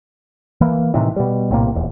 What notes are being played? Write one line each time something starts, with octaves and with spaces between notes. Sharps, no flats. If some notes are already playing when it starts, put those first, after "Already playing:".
E3 A#3
A2 C3 D#3 E3
B2 G3
A#1 A2 C3 A#3
D#1 E2